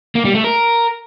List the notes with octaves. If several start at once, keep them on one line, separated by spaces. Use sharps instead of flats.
A#3
G3
A3
A#4